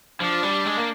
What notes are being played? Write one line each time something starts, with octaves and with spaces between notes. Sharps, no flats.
F3 D4
G3
G#3
A#3